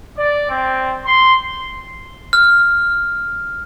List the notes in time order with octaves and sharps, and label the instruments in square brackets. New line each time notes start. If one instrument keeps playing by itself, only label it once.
[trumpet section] D5
C4
C6
[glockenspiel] F6